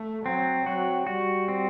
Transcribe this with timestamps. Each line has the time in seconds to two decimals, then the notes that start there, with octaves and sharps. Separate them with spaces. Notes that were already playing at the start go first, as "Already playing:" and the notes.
Already playing: A3
0.25 F#3 C4
0.66 F#3 F#4
1.07 G3 F#4
1.48 C4